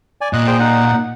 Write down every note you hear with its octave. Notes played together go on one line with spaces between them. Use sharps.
D5 G#5
A#2 D#5 F#6
G#4 C5 G5
D#4 F#5